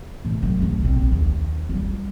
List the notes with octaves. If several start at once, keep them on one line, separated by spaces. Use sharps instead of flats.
A2 E3
F#2 C#3
A1 D#2
A#1 C4
D#2
G3 F4